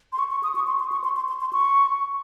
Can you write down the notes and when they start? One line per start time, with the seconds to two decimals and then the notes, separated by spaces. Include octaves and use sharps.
0.13 C6
0.19 C#6
0.31 C#6
0.43 D#6
0.55 C#6
0.67 C6
0.80 C6
0.92 C#6
1.04 C6
1.16 C6
1.28 C6
1.41 C6
1.53 C#6